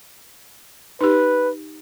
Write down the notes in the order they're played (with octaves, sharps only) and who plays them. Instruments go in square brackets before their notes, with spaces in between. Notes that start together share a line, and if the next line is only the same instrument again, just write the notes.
[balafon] D#4 G4 [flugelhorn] B4